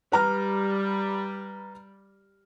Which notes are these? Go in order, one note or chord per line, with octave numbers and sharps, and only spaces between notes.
G3 B4 A#5 F6